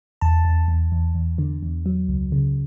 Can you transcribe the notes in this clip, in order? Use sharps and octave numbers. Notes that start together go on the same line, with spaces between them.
E2 A5
E2
E2
E2
E2
D3
E2
F#3
C#2
C#3